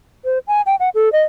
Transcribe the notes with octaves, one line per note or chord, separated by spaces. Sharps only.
C5
G#5
G5
F#5
A4
D#5